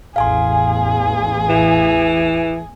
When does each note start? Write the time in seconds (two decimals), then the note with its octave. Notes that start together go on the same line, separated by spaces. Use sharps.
0.16 A1 E2 G#4 F5 G#5 C6
1.49 E3